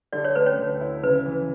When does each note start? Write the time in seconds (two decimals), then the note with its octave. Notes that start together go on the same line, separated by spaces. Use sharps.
0.13 D3 D5
0.25 C#5
0.35 A3 B4
0.46 C#4 C#5
0.58 D2
0.81 E4
1.03 C#3 B4
1.25 E3